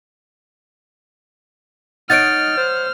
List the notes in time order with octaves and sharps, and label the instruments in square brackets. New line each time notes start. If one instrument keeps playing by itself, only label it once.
[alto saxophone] D#4 [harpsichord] C#5 D#5 F#5 [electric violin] F6 [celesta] A6 D7
[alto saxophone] C5